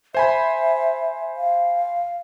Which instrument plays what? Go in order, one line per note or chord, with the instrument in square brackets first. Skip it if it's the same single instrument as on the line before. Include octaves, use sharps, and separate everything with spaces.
[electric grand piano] C5 G#5 B5 [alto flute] E5
[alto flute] F5